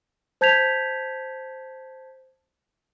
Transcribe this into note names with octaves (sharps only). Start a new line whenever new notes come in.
C5 A5 G6 G#6 B6 F7